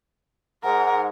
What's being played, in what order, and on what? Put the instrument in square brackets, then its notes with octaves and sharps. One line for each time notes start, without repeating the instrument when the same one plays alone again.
[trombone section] G#2 [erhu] A#4 [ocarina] F#5